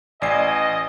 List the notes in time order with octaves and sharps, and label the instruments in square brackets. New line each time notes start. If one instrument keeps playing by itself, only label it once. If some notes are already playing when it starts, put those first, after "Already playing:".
[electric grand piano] A1 C7 [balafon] D5 [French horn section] D#5 [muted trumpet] G#5